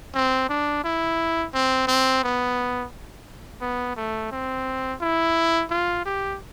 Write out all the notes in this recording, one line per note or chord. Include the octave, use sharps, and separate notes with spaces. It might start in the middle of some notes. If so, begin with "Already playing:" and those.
C4
D4
E4
C4
C4
B3
B3
A3
C4
E4
F4
G4